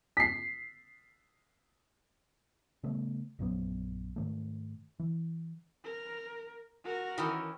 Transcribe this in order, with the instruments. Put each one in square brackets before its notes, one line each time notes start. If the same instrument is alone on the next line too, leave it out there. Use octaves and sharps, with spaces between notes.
[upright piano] B6 C7
[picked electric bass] C#3 G3 A3 B3
A#1 F#2 F#3 B3
G#2 D#3 A3
E3
[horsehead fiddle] A#4
F#4 A#4
[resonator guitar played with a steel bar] D#3 E3 C#4